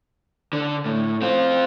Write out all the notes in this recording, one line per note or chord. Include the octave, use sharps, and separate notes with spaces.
D3
A2
C4 F4